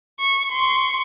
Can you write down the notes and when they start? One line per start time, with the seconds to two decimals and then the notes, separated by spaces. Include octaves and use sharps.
0.20 C#6
0.52 C6 C#6